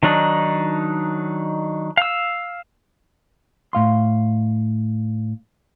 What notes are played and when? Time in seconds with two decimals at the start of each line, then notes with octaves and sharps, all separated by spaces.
0.03 D#3 F#3 D4 D#4
1.97 F5 E6
3.73 A2 F5 C6